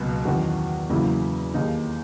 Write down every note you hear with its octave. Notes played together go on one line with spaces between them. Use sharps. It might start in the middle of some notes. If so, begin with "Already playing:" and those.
Already playing: C#2 B2 F#3 A#3
E2 D#3 F#3 C#4 F#4
E2 C#3 F#3 A#3 E4
D#2 D#3 A#3 D#4 G#4